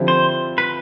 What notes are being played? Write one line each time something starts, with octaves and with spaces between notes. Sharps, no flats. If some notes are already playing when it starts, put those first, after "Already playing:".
Already playing: D3 F3 C4 E4 G4
C5
B4